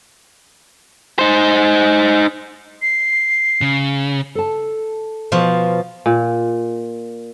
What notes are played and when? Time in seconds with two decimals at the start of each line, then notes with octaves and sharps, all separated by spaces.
1.19 D#4 C5
2.82 C7
3.61 C#3
4.35 A4 A5
5.32 B2 F3 F4
6.06 A#2